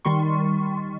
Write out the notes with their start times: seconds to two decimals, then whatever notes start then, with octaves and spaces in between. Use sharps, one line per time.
0.05 D#3 G3 C6 C#6